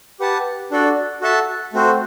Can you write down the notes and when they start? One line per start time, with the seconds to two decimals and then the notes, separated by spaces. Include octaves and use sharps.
0.20 G4 B4 F#5 A5
0.71 D4 F#4 A4 D5
1.21 F#4 A4 E5 A5
1.73 A3 C4 F#4 C5